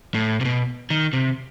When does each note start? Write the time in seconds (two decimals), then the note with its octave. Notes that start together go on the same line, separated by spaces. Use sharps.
0.15 A2
0.41 C3
0.45 B2
0.90 D#3
1.13 C3